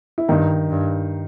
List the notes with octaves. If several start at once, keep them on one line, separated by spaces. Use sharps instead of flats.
E4
G2 D#3 D#4
G2